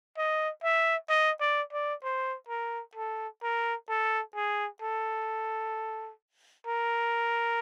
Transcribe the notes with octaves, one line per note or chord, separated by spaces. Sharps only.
D#5
E5
D#5
D5
D5
C5
A#4
A4
A#4
A4
G#4
A4
A#4